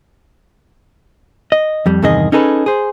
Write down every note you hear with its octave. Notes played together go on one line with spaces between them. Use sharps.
D#5
F2 G3
E2 G2 C3 D#3 G#4 D#5
C#4 D#4 G#4 A4 B4
G#4 C5